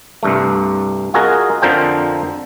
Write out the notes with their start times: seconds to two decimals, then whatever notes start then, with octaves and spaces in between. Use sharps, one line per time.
0.23 C2 G2 A3
1.14 F4 F#4 G#4 A#4 D#5
1.62 F2 D3 F3 A#4 C5 G5